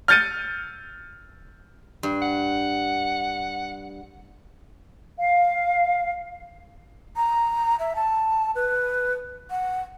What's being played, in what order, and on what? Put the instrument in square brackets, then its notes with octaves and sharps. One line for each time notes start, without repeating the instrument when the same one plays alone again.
[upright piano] F6 G6 A6 C#7 D#7
[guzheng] G2
[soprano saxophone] F#5
[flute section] F5
[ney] A#5
E5
A5
B4
F#5